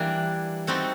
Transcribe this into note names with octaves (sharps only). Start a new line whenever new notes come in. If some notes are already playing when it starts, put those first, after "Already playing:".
Already playing: E3 G3 A#3 D4
G3 C4 D#4 F#4 A4